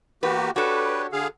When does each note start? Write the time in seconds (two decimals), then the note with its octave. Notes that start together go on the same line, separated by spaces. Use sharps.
0.23 E2 A#3 F#4 G4 B4
0.56 D4 F#4 G4 A4 B4 C#5
1.13 D3 G#4 F5